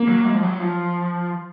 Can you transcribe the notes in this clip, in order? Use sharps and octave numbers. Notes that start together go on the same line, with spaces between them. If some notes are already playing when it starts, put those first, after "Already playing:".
Already playing: A#3
F#3
G#3
F3
F#3
F3